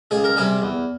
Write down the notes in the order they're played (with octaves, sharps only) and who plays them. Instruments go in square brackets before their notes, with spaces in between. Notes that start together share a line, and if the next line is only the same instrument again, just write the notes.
[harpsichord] C#2 G#4
A#4
C3 G3 G#4
E2